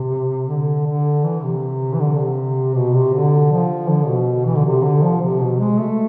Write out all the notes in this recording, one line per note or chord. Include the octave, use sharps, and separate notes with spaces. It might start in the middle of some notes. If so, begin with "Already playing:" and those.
Already playing: C3
D3
D3
E3
C3
E3
D3
C3
B2
C3
D3
F3
D3
B2
E3
D3
C3
D3
F3
C3
B2
G#3
A3